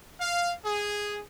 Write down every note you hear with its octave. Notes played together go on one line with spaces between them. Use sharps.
F5
G#4